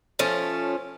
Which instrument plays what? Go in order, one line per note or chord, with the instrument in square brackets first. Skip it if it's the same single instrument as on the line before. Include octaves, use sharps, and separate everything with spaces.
[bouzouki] F3 A3 C#4